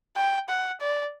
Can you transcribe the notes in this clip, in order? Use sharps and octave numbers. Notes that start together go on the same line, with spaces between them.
G5
F#5
D5